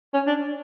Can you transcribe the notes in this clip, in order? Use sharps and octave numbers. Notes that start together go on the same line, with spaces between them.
C#4
D4